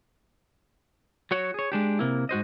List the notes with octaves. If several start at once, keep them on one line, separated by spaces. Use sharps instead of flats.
F#3 F#4 C#5
G#4 C#5
G#3 D4 G4
C3 A#3 E4
G#2 F#4 C5 D#5